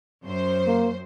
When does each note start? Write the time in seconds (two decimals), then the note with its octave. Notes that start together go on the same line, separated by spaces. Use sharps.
0.25 F#2 C5
0.67 A#3